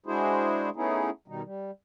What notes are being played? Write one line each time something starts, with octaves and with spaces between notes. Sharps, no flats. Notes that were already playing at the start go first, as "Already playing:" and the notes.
G#3 D4 E4 F#4 G#4 C5
A3 B3 C#4 D#4 E4 G#4
B2 D#3 G3 D#4
G3